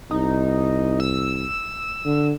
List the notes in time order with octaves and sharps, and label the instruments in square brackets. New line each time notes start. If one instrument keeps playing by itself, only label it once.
[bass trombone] C2 [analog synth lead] D#4
[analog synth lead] E6
[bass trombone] D3